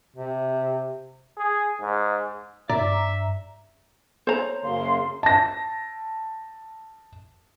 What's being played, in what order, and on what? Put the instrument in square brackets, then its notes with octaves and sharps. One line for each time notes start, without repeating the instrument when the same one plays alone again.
[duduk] C3
[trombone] G#4
G#2
[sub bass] G2 [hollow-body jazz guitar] D5 [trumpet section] E5 [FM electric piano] A#5
[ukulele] C5 A#5 [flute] C#5
[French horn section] F#2 C#3 A#3 [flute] F5 [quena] C6
[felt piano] A5 A#6